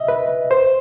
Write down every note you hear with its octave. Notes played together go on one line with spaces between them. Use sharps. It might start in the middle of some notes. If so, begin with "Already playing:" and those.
Already playing: D#5 E5
B4
C5